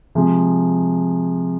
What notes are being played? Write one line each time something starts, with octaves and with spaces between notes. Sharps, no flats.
C3 F3 G#3